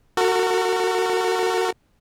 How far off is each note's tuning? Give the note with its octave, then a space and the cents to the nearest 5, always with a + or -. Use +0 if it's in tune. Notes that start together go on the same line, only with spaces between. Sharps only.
F#4 +0 A#4 -45